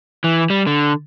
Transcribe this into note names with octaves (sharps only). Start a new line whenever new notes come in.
E3
G3
D3